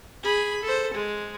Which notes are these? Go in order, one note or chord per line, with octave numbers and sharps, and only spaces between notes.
G#4 B5
A4 C5
G#3